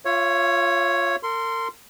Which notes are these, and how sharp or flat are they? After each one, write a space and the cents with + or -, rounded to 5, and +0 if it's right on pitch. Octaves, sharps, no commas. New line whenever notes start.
F4 +0 C#5 +0 E5 +45
A#4 -40 C6 -5